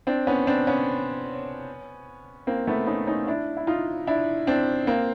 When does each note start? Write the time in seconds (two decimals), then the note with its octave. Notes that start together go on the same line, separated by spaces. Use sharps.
0.07 C4 D4
0.27 B3 C#4
0.47 C4 D4
0.67 B3 C#4
2.47 A#3 C4
2.67 A3 B3
2.87 C#4 D#4
3.07 C#4 D#4
3.27 D4 E4
3.57 E4
3.67 D#4 F4
4.07 D4 E4
4.47 C4 D4
4.87 A#3 C4